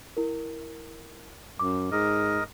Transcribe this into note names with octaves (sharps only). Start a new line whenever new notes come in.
E4 A#4
F#2 D6
G#2 A#4 D#5